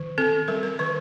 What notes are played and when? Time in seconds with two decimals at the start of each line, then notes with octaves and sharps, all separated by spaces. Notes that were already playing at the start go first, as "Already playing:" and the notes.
Already playing: D#3
0.18 C4 A4
0.48 G3 A#4
0.63 A#4
0.79 D#3 B4